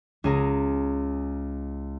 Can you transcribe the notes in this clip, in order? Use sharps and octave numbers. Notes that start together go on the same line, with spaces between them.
C#2 G#4 A#5